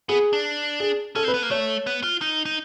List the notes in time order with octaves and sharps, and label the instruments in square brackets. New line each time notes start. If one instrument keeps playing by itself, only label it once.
[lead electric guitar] B3 [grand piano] G#4
[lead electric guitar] D4
[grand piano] G#4
[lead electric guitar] C#4 [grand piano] A4
[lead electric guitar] C4
[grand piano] B4
[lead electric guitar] B3
A#3
[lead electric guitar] A3 [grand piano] C#5
[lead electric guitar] B3
F4
D#4
D#4